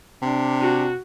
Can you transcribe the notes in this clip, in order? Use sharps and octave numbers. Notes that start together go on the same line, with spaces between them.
C3 D4
F#4